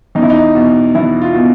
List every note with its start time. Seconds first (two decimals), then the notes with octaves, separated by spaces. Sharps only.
0.15 E2 D#4
0.22 E4
0.30 D#4
0.55 B2
0.95 E2 E4
1.22 F4
1.34 B2